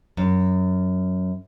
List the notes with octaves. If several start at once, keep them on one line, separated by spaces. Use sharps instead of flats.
F#2